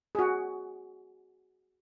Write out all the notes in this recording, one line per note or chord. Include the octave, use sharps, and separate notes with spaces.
F#4 G#4